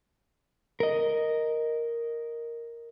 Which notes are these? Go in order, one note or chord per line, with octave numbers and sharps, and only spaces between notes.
A#4 D#5